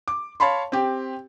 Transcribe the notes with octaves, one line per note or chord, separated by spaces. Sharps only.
D6
C#5 F5 A5 B5 C6
C4 G4